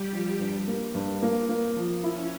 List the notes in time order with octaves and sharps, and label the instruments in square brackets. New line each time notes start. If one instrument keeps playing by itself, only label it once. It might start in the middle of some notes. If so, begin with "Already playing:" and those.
Already playing: [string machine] G3 G4
[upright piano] F3
G2
A#3
G2
A#3
A#3
F3
[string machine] C#4 [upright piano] E4